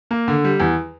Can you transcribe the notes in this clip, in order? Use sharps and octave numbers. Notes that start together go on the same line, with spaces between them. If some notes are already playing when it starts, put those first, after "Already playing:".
A#3
D3
G3
E2